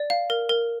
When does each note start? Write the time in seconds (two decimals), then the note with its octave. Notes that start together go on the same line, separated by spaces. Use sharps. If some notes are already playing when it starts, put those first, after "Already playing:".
Already playing: D5
0.10 F5
0.30 A#4
0.49 A#4